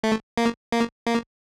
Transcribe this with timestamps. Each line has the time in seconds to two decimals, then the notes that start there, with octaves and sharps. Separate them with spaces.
0.04 A3
0.37 A#3
0.72 A#3
1.07 A#3